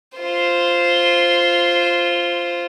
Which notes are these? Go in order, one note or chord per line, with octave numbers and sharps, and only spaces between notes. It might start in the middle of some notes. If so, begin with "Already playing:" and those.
F4 C5